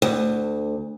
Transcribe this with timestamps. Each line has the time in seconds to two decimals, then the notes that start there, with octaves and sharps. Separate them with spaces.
0.02 D2